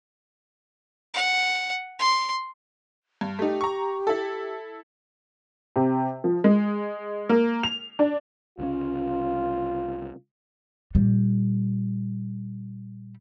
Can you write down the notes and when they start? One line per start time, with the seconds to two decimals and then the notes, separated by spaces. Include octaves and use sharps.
1.14 F#5
1.99 C6
3.21 G2
3.39 A3 D#4 G4
3.61 A#5 C#6
4.07 E4 A4
5.76 C3
6.24 F3
6.44 G#3
7.29 A#3
7.63 F7
7.99 D4
8.59 C2 C#3 C#4 F4
10.95 A#2 G3